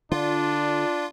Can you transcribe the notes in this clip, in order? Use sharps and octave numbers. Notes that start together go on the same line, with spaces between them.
D3 D4 F4